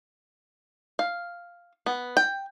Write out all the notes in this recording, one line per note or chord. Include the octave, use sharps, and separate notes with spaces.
F5
B3
G5